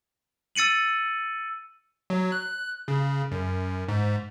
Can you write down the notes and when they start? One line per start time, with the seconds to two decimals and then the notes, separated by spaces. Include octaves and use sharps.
0.55 E6 A6 C#7 D#7 F#7
2.10 F#3
2.32 F#6
2.88 C#3
3.32 F#2
3.88 G#2